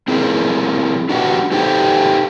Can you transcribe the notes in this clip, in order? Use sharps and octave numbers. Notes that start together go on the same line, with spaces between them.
C4 E4 G#4 A#4
D4 F#4 G4 B4 F#5
D#4 G4 A4 B4 C5 G5